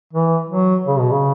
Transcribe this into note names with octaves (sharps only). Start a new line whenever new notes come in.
E3
F#3
C#3
B2
C#3